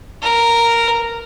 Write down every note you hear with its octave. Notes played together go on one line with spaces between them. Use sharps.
A#4